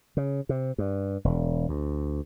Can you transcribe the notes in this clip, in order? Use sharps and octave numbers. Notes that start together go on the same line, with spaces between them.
C#3
C3
G2
E1
D2